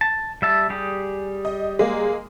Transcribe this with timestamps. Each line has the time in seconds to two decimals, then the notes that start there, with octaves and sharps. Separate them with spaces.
0.01 A5
0.42 G3 E5 A5
0.70 G3 G4 G#4
1.45 D#5
1.79 G#3 A#3